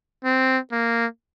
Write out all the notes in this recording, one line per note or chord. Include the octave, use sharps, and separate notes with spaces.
C4
A#3